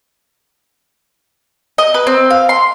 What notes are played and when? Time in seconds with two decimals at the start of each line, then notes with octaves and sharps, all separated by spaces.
1.78 D#5
1.94 B4
2.07 C4
2.30 F5
2.49 C6